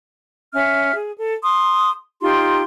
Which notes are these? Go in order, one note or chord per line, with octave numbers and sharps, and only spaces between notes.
C#4 E5 F6
G#4
A4
C6 D#6
D#4 F4 G4 C6